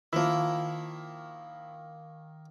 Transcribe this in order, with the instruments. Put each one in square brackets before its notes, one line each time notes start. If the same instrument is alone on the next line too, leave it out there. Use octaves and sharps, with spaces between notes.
[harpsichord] D#3 A#3 [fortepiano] F3 E4